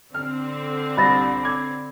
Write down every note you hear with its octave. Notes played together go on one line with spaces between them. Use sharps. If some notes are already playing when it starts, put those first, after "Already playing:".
D3 C4 F6
C2 B5 A6 A#6
D6 G#6